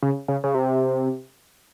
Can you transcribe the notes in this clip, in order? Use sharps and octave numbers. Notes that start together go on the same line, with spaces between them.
C#3
C#3
C#3
C3